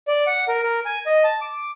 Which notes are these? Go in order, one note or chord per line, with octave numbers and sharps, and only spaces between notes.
D5
F#5
A#4
A#4
G#5
D#5
A5
D6